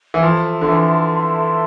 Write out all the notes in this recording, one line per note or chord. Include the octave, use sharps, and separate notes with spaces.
E3
F3 A4 E5 A5 C6
D3
E3